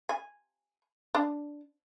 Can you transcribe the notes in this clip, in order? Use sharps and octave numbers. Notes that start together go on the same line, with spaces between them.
G#5
D4